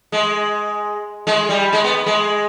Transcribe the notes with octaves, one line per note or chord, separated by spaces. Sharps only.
G#3
G#3
G3
G#3
B3
G#3